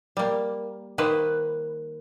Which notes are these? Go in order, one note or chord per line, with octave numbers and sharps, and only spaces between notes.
G3 A#3
D#3 A#3 B4 C5